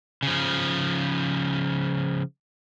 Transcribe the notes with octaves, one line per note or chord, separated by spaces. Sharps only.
C#3 F3